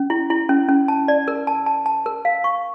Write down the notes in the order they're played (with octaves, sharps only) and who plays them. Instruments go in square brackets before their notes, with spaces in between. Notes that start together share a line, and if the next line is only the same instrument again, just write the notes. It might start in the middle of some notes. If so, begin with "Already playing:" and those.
Already playing: [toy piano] C#4
E4
E4
C#4
C#4
A5
D5
A#4
A5
A5
A5
A#4
F5
C#6